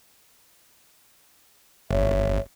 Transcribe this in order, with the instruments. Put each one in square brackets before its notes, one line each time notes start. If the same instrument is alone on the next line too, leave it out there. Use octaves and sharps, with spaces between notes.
[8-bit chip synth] G1 [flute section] C#5 E5